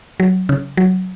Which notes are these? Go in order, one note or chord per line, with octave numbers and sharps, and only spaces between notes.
F#3
C#3
F#3